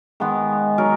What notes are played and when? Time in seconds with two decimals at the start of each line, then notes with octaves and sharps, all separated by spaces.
0.20 D#3 G#3 B3
0.78 F#3 B3 D#4 A#4